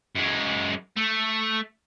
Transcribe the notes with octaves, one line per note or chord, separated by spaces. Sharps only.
F#2 G#3
A3